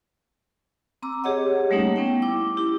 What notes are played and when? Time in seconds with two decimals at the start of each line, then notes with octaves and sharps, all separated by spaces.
1.02 C4 A#5 D6 E6
1.24 G4 G#4 C#5 D#5 F#5
1.71 G3 A3 A#3 C#4 D#4
1.96 B3 C#4 G5
2.22 E4 D6
2.57 E4 G4